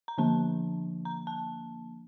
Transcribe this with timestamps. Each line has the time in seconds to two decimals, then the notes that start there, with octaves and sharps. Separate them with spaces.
0.08 A#5
0.18 D3 F3 A#3 D4 A5
1.05 A#5
1.27 A5